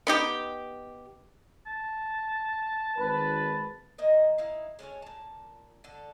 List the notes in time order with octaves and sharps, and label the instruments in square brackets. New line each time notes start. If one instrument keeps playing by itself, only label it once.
[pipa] B3 D#4 G4
[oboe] A5
[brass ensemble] G#1 B4
[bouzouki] D#3 A#3 D#5 E5
D#4 E4 F5
G#3 C#4 A4 C#5
A#2 A5
D3 A4